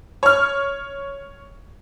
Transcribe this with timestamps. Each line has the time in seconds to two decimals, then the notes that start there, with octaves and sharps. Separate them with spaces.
0.23 C#5 F6